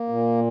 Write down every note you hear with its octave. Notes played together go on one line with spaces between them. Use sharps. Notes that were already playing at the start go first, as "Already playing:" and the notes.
Already playing: A#3
A#2